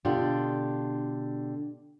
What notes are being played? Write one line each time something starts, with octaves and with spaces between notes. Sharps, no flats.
B2 D3 D4 F4 G4